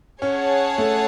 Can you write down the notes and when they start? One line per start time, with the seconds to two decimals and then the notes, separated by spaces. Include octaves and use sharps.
0.21 C#4 G#4 C#5 F#5 A5
0.78 A3